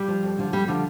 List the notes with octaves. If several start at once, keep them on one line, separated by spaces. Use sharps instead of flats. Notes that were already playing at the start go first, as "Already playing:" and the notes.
Already playing: G3
F3
F2
D3 F3
F2 G3
D3 F3 G3